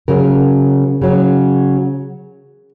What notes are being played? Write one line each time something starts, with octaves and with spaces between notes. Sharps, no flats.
C#3 F#3 A#4
C#3 F#3